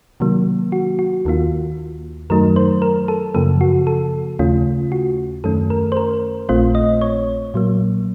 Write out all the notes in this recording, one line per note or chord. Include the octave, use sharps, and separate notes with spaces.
C3 D#3 F#3 A#3
F#4
F#4
D#2 D#3 A#3 F4
F#2 D#3 F#3 A3 D#4 A#4
C5
A#4
A4
F#2 C#3 F3 A#3 A4
F#4
A4
D#2 C#3 A3 C#4 F4
F#4
F#2 D#3 A3 C#4 A4
A#4
C5
A#4
A#1 A#2 A3 C4 F4 C5
D#5
C#5
A#2 F#3 A#3